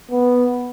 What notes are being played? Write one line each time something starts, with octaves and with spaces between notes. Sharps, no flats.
B3